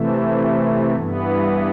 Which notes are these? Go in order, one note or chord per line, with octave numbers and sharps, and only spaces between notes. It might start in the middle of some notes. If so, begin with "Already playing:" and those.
Already playing: C3 E3 A3
G2 E3 B3